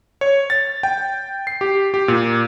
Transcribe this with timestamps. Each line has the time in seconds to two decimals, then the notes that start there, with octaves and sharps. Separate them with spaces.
0.21 C#5
0.50 A6
0.83 G5
1.47 C7
1.61 G4
1.94 G4
2.08 A#2